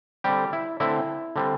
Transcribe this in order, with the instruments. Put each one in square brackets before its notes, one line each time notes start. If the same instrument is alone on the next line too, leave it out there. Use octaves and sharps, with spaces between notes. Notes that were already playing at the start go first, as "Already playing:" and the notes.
[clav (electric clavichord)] D3 G3 C4 G4
E4
D3 A3 C4 E4
D3 G3 C4